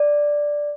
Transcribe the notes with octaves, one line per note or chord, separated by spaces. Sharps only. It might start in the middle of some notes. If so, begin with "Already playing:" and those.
Already playing: D5